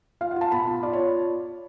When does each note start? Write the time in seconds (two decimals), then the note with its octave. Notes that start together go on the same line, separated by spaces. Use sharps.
0.21 F4 F5
0.31 F#5
0.36 F4 A5
0.52 B2 B5
0.62 A5
0.68 F4
0.83 F4 D5
0.93 C#5